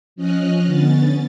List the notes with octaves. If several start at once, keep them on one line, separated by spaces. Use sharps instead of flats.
F3 C#4 D#5 F6 F#6
D3 B3 C#4 A6